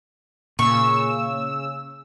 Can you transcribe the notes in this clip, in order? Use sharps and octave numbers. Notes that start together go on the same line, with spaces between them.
A#2 C#3 C#6 E6